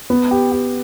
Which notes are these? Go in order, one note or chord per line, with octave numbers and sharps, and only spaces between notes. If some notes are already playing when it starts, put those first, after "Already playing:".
B3
G4
G4